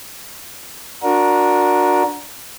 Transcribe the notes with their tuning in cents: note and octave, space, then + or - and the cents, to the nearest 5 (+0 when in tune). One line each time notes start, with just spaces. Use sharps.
D4 +0 F#4 -25 A#4 +10